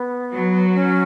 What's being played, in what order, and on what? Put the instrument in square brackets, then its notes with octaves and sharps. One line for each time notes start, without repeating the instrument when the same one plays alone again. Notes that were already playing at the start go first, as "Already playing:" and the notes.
Already playing: [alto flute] B3
[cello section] F#3
[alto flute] C#4